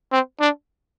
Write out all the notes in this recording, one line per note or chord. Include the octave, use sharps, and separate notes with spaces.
C4
D4